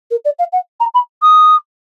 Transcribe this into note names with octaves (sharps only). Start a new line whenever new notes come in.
A#4
D5
F5
F#5
A#5
B5
D#6